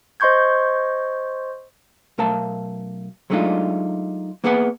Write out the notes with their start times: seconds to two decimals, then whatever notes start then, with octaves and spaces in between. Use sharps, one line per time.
0.20 C5 D#5 C6 C#6 G6 G#6
2.18 B1 A3 A#4 F5 A5
3.30 F#3 G#3 A3 D4 D#4 F4
4.44 A#3 B3 G#4 B4 C5 F#5